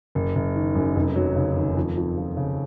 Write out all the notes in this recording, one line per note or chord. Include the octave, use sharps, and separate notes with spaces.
F#1
F#1
D#3
F#2
F1
F#3
C#3
D#2
F2
F2
F3
C#3